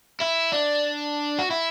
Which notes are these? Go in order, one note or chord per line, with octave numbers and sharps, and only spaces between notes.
E4
D4
F#4
E4